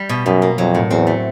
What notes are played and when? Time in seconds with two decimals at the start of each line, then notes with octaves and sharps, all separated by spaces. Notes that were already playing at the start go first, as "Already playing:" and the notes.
Already playing: G3
0.09 B2
0.26 F#2 B2
0.42 A#3
0.58 F2 F#3
0.75 A2
0.90 E2 C4
1.07 A3